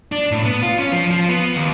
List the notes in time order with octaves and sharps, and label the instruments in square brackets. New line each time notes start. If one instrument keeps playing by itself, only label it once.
[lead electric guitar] D4
A2
B3
F4
C#4
F3
F3
B3
D#2